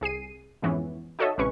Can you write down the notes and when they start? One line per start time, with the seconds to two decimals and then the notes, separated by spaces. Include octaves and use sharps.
0.01 C2 G#4 C7 D#7
0.62 F2 G#2 E3 B3 C#4
1.19 D#4 F#4 A4 C#5 D#5 E5
1.38 A1 C3 G#3 C#4 B4 C#6